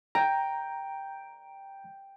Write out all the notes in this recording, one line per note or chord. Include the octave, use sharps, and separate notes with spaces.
G5 A#5